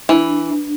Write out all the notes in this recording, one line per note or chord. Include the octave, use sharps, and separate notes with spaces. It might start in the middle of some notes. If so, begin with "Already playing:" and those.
E3 D4